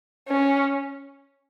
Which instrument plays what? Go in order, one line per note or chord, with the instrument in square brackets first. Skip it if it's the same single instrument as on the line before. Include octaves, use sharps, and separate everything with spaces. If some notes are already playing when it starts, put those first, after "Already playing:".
[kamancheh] C#4